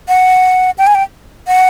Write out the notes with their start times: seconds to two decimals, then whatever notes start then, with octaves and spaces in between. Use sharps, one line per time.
0.08 F#5
0.78 G5
0.87 G#5
0.95 G5
1.47 F#5